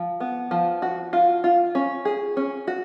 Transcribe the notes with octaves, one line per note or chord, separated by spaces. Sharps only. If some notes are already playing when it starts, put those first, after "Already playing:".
Already playing: F3
B3
F3
F#4
F4
F4
C#4
G#4
C#4
F#4